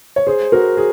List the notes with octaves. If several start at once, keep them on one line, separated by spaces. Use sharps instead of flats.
C#5
G#4 C5
F#4 A#4
G#4